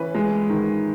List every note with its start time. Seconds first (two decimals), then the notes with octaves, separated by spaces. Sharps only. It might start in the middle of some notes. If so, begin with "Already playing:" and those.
Already playing: E3 C#4 B4
0.14 G#3
0.49 D#3